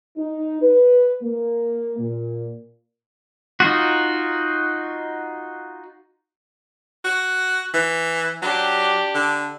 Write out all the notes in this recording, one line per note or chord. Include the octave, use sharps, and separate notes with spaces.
D#4
B4
A#3
A#2
D#4 F4 F#4
F#4
E3
F#3 D4 G4
D3